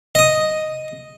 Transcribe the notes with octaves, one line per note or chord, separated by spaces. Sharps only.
D#5 D#6